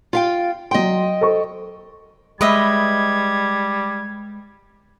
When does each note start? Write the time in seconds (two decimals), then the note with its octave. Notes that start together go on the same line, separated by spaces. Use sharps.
0.13 F4 F5 G5
0.71 F#3 D#5 G5 C6
1.21 A4 C5 C#6
2.41 G3 G#3 B4 D#5 E5 G#6